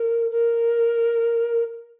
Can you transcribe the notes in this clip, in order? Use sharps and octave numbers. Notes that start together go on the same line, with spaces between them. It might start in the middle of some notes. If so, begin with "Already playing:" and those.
Already playing: A#4
A#4